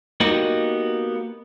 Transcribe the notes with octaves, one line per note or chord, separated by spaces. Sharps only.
A#3 B3 D#4 F#4 G4